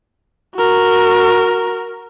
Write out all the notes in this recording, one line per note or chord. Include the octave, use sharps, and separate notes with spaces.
F#4 A#4